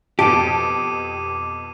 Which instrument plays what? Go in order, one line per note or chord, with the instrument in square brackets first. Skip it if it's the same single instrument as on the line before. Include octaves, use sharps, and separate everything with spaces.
[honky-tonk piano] F2 B2 [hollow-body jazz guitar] G4 [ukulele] A5 [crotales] D6 D#7